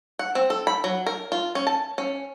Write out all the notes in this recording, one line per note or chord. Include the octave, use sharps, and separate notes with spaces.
F#5
C4
A4
B5
F#3
A#4
F4
C#4
A5
C#4